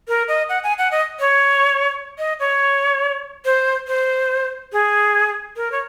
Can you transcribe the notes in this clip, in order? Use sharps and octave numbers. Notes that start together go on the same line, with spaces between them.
A#4
D#5
F#5
G#5
F#5
D#5
C#5
D#5
C#5
C5
C5
G#4
A#4
C#5